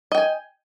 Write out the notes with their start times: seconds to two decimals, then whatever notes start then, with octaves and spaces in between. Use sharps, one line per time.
0.12 D#5
0.15 G5
0.18 G#5